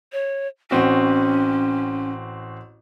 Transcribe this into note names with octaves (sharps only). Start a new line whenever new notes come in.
C#5
A1 C4 C#4 F#4